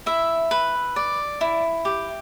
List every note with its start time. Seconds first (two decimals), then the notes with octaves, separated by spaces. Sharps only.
0.06 E4 E5
0.51 B4
0.96 D5
1.41 E4
1.85 G4